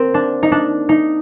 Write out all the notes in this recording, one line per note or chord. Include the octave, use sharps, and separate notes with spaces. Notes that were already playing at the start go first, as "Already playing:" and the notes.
Already playing: A#3 C4
D4
D#4
D4
D#4